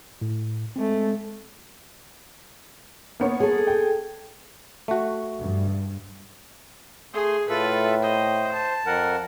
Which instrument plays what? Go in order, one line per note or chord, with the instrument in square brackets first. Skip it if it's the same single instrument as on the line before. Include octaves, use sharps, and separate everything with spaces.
[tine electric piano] A2
[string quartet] G#3 A3 [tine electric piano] C4
[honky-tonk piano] A#3 B3 C#5
[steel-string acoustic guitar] G#4 A4
[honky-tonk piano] G5
[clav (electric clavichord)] A3 F#4
[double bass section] G2
[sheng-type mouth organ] A3 C6 D#6 [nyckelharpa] G#4
[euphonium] A2 [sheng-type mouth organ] F4 A4 E5 [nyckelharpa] B4
[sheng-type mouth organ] C5 [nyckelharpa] D#5
[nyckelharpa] A5
[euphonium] F2 [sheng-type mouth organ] A#4 F#5